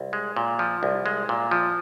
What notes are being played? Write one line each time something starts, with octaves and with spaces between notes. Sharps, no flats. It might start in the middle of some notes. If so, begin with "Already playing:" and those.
Already playing: C2
G#3
A#2
F3
C2
G#3
A#2
F3